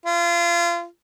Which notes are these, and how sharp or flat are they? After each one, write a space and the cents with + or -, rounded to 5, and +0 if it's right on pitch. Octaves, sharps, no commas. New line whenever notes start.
F4 -30